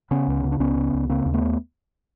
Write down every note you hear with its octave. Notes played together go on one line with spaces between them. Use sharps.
C#3 B3 C#4
C#2
C#3
D4
C#2 B3 C#4
C#3
C#2
C#3 A#3 C4
D#2
A3 B3